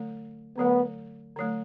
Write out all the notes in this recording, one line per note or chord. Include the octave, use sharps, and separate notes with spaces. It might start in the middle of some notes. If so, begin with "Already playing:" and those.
Already playing: D3 F#3 A3
D3 F#3 A3 B3
D3 F#3 A3